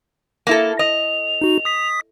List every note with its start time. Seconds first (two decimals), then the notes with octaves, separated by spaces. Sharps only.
0.47 A#3 E4 A4
0.79 D#5 F7
1.41 D#4 F#4
1.65 D#6 B6